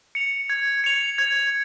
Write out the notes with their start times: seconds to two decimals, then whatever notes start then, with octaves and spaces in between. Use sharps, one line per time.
0.15 C#7 F7
0.50 G#6
0.84 C#7 F7
1.18 G#6